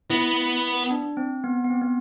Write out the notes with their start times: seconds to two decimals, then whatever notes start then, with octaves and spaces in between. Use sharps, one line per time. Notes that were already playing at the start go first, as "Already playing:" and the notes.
0.10 B3 E4
0.91 D4
1.17 C4
1.44 B3
1.65 B3
1.70 C4
1.82 B3